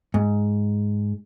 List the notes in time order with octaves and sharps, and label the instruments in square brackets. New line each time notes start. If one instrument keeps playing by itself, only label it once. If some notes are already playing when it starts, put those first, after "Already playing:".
[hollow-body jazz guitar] G#2